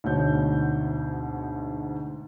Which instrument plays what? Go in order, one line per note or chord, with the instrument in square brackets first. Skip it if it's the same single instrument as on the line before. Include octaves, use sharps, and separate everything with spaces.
[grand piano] D2 G#2 B2 C#5 G6